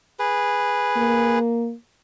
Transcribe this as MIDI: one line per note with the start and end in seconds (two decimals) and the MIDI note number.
0.19 1.39 68
0.19 1.39 71
0.97 1.74 58